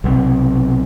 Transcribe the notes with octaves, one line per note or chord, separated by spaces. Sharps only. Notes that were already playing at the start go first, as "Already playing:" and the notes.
B1 C3